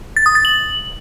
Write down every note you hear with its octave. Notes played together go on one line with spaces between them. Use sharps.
A6
D#6
A6
F#7